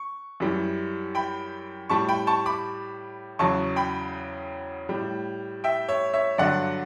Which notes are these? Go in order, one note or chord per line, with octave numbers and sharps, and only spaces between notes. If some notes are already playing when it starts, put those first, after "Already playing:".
Already playing: C#6
F#2 E3 G3
G5 B5
A2 G3 A5 C#6
G5 B5
A5 C#6
B5 D6
E2 C#3 F#3 A5 C#6
G5 B5
A2 G3
E5 G5
C#5 E5
C#5 E5
G2 D3 F#3 D5 F#5